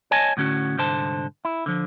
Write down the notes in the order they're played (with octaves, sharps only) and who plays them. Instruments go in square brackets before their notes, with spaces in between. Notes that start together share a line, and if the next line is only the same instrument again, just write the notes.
[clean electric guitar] C#5 D#5 G#5 A5
A2 D3 C#4 F#4
C2 G#2 D3 C5 A5
E4
D3 F3